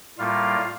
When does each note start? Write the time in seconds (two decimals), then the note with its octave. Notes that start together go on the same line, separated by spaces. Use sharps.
0.18 A2 G3 A#3 F4 F5